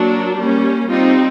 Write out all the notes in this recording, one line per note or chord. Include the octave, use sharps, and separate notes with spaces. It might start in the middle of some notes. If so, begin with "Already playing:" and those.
Already playing: F#3 A#3 D4
G3 A#3 C#4
G3 C4 D#4 F4